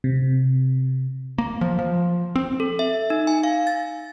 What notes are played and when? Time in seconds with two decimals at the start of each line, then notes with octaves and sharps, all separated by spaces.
0.04 C3
1.38 A#3
1.61 F3
1.79 F3
2.36 C4
2.60 A4
2.79 E5
3.10 D#4
3.27 G#5
3.44 F5
3.67 A6